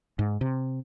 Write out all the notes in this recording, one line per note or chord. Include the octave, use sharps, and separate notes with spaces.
G#2
C3